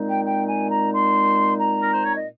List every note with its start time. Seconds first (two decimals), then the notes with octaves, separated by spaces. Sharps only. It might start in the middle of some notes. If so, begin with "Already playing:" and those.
Already playing: A#2 G#3 C4 D#4
0.10 G5
0.26 G5
0.49 G#5
0.71 A#5
0.94 C6
1.61 A#5
1.81 A#4
1.93 C5
2.04 C#5
2.16 D#5